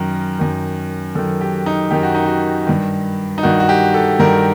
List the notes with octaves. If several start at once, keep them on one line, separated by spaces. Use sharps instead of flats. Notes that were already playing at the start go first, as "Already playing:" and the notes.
Already playing: F#2 D#3 A#4
F#2 D#3
F#2 D#3 A4
G4
D#4
F#2 D#3 G4
F#4
D#4
F#4
G2 D#3
D#4
G2 D#3 F#4
F#4
G4
A4
G2 D#3 A#4